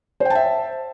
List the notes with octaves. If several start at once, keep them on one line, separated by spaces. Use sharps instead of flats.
C5 E5 G5 A5